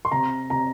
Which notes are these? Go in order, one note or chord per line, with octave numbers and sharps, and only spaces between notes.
C6
C3 A#5
C3 A#5